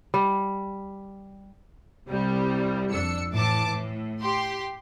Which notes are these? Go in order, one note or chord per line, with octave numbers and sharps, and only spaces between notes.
G3
C2 G3
F2 D4 E6 C#7
A2 E3 A5 D6
A2
G4 C6